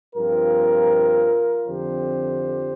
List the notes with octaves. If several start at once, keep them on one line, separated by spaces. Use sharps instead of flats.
G2 F3 C4 F4 A#4
F2 D3 F3 C4 G4 C5